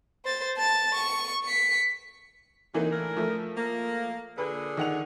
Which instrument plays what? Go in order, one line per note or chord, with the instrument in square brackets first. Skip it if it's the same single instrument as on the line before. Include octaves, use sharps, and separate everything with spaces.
[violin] C5 A6
A5 A6
C#6
B6 C#7
[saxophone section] C3 F#3 D#4 [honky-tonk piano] E3 A#3
[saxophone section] A2 D3 A#4
[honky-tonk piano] F3 A3
[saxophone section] A#3
[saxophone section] A#2 D3 G#4 [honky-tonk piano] B4
[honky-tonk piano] D#3 F#5 F7